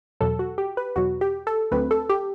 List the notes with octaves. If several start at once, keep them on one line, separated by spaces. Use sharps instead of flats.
E2 B2 F#3 A4
F#4
G4
B4
E2 B2 F#3 F#4
G4
A4
D2 D3 F#3 A3 C4 B4
A4
G4